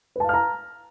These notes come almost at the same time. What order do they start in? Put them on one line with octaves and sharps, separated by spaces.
B4 A5 F5 F6 A#5